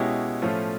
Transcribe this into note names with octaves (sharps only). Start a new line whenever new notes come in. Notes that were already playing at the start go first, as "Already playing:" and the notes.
Already playing: B2 G#3 C#4 E4 G4
A2 F3 A3 C#4 F4